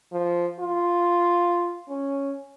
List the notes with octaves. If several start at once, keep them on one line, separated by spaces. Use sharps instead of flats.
F3
F4
C#4